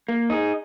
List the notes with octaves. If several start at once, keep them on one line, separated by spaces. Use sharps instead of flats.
A#3
D#4 G#4